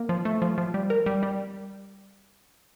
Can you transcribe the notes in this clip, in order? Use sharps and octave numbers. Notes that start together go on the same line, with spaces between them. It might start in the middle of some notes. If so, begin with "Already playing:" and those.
Already playing: A#3
F3
A3
F3
F3
G3
A#4
G3
G3